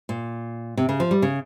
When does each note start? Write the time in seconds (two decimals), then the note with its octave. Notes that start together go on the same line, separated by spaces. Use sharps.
0.09 A#2
0.77 C3
0.89 C#3
1.00 F3
1.11 G3
1.22 C#3